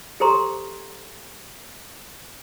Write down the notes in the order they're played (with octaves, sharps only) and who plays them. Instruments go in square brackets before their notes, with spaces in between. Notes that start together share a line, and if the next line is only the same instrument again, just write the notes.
[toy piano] G4 A4 C5 A#5 C6